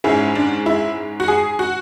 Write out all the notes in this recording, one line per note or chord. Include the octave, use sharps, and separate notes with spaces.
G#2 G#3 C#4 E4
D4
E4
F#4
G#4
F#4